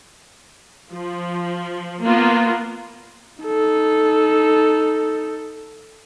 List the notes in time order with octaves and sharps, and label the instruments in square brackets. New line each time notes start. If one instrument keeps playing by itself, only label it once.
[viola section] F3
A#3 B3 F4
[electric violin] D#4 A4